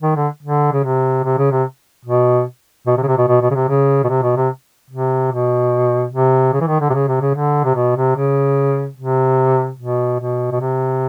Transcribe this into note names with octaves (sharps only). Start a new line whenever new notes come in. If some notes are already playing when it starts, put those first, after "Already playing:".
D#3
D3
D3
C#3
C3
C3
C#3
C3
B2
B2
C3
C#3
C3
B2
B2
B2
C#3
C3
C#3
B2
C3
B2
C3
C3
B2
C3
C#3
E3
D#3
D3
C3
C#3
C3
C#3
D3
C3
B2
C3
C#3
C3
B2
B2
B2
C3